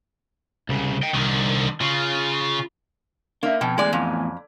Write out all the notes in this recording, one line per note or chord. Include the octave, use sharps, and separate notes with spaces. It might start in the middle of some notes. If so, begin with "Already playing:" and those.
C2 C#3
D#5 G5
C2 D3 D#3
C#3 F4
A#3 D4 E5
F2 B2 G5
E2 A2 G#3 D5 G#5
F2